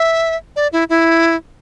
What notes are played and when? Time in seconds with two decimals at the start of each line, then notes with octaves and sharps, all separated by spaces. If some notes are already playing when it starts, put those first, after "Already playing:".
Already playing: E5
0.56 D5
0.72 E4
0.89 E4